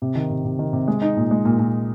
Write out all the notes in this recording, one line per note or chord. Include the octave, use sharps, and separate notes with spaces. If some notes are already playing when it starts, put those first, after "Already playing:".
C3
D#3
C3
C3
D#3
C3
G#3
D#4
A#2
G#3
A#2
A#2